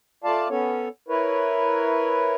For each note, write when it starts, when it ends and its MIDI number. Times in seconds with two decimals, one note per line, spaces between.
0.24 0.48 57
0.24 0.48 65
0.24 0.48 74
0.24 0.48 77
0.24 0.48 81
0.50 0.88 59
0.50 0.88 61
0.50 0.88 69
0.50 0.88 73
1.08 2.36 64
1.08 2.36 70
1.08 2.36 71
1.08 2.36 73